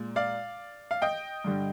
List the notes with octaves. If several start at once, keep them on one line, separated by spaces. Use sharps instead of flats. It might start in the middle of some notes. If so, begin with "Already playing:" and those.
Already playing: A#2 G#3
D5 F5
F5
D#5 G5
G2 D3 G3